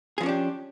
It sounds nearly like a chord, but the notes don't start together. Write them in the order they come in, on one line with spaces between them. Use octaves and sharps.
G#4 F3 C#4 D4 G4